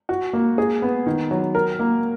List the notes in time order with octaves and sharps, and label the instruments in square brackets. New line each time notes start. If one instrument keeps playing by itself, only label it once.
[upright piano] F#4
A#3
G#4
B3
D#3
F#3
A#4
A#3